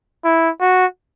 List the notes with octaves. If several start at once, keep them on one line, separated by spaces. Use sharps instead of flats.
E4
F#4